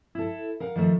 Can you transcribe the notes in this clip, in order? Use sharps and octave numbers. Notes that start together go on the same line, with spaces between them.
E4 A4
A#4 F5 F#5
D#3 F3 A3